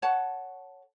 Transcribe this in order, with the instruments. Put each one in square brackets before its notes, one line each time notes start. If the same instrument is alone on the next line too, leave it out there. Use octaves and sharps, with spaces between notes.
[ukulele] A4 C#5 F#5 A5